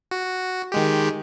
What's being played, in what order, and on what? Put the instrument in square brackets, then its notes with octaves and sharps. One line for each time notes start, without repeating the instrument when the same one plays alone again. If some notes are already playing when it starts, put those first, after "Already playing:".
[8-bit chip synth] F#4
D#3 G#3 G4